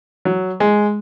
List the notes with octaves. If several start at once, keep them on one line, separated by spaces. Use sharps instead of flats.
F#3
G#3